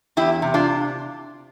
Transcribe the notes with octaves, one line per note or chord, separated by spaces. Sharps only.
E2 E4 G4
C3
D4 F4